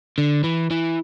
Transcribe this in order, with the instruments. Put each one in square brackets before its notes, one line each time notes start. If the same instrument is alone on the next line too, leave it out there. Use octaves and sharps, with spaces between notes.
[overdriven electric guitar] D3
E3
E3